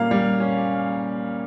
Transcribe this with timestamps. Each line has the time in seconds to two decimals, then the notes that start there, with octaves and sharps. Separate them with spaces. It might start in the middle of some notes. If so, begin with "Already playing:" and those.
Already playing: A#2 G3 A#3 C#4 F5
0.11 G3
0.40 C#4